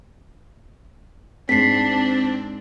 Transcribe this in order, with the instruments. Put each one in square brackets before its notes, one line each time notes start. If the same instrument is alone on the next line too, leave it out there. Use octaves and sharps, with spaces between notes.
[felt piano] G#2 G#3 [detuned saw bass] C4 [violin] D4 [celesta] B6 C7